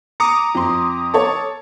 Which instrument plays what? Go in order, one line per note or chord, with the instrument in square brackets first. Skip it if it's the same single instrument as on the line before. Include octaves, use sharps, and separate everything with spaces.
[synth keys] A#5 D6 D#6 [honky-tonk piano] C#7
[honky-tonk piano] F2 C6
A4 C#5